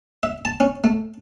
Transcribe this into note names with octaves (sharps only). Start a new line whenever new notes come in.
E5
A5
C#4
A3